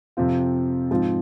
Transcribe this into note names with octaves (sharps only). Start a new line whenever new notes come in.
F2 C3 F3 C4 F4
G#2 F3 C4 F4